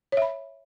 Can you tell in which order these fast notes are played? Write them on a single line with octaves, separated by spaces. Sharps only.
C#5 E5 B5